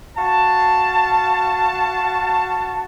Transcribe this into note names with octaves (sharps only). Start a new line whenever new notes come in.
F#4 F5 A5